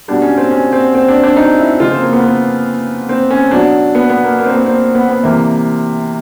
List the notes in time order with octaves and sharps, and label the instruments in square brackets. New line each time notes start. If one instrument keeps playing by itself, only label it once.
[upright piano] B2 G3 D4
C#4
C4
C#4
C4
C4
D4
D4
D#4
E4
C#3 F3 F4
C4
A#3
B3
B3
C4
C#4
B2 F#3 D4
B3
B3
A#3
A#3
C4
B3
C4
B3
B3
C3 E3 G3 A#3